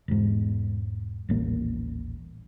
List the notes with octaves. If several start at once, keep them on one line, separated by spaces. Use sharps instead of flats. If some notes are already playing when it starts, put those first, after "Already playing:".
E1 G#2
D#1 A1 A#3